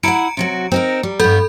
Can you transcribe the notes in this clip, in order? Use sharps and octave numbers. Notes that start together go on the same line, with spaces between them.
E4 F5 F#5 A#5 C#7 D7
C3 F#3 F#4
C4 D#4 A#4
G3
G2 B3 A4 B5 G6